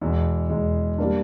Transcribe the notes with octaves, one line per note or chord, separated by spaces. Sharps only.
E2 B2 G#3
E2 B2 G#3
G3 A#3 D4